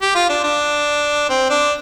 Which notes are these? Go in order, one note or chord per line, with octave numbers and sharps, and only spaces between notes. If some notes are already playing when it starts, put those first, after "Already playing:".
G4
F4
D4
D4
C4
D4